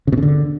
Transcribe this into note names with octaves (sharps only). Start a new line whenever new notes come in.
C#3
B2
C#3
D3